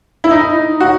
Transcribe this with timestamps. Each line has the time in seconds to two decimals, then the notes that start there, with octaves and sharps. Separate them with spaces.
0.24 E4
0.31 D#4
0.80 F#4